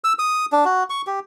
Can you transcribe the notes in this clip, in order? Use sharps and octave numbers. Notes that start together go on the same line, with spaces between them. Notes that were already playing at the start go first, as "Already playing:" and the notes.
E6
D#6
D4
F#4
C#6
G4